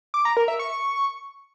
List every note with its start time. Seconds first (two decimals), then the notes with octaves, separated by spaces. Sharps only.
0.14 D6
0.25 A#5
0.37 A#4
0.48 E5
0.59 C#6